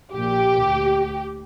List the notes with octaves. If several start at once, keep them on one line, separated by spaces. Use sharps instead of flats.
A#1 A#2 G4
D2